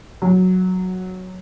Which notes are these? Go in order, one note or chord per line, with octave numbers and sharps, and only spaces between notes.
F#3